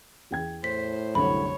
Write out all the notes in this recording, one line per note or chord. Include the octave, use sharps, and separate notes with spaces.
E2 G5 G#6
A2 C5 B6
C2 F#2 D3 C#5 B5